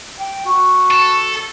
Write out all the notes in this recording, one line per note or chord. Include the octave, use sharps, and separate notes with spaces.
G5
F#4
A4